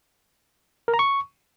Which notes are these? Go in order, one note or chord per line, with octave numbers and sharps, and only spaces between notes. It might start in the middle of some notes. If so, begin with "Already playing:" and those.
A#4
A#5
C#6